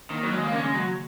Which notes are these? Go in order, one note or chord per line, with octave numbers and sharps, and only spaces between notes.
D#3 A#3
F#3
D#3 G#3
C#3 A#3
C#4
G#3
F#3